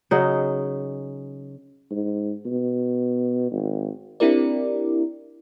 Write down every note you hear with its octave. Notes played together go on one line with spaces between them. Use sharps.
C#3 F#3 D#4
G#2
B2
G#1
C4 D4 E4 G4 A#4 D5